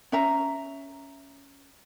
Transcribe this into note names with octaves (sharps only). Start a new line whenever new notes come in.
C#4 E5 A#5